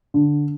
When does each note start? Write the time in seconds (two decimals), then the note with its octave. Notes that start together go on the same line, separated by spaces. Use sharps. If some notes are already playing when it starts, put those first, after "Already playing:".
0.14 D3